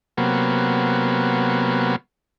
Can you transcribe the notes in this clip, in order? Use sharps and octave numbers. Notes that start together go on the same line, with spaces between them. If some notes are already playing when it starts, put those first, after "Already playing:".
C3 F#3 A#3 B3